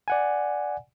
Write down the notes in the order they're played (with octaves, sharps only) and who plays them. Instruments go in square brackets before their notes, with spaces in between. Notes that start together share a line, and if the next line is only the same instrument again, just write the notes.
[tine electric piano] D5 F#5 G#5